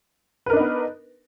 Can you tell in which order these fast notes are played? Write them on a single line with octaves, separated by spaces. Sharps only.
B4 A#4 D4 D#4 B3